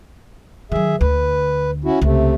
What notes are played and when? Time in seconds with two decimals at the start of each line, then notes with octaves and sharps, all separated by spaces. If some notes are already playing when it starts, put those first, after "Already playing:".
0.72 D#3 F#3 G#4 E5
1.01 D2 B4
1.85 C#4 E4 F#4
2.02 C#2 C3 A3